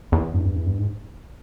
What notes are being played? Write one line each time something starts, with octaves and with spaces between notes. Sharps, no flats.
E2
G2
E2
G2
E2
G2
G#2